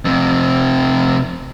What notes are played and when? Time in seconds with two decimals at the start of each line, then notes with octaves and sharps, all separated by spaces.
0.05 F2 C3